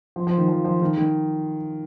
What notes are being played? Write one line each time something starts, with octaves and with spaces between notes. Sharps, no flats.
F3
F3
D#3
F3
F3
D#3
D#3